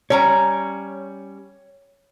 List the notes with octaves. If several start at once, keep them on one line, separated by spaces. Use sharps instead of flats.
G3 C#4 C#5 A#5